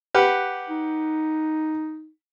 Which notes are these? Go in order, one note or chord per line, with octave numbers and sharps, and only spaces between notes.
G4 B4 F#5
D#4